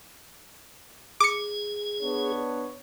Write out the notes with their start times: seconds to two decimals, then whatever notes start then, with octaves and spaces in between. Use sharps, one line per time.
1.20 G#4 D6 C#7
2.02 B3 D4 C#5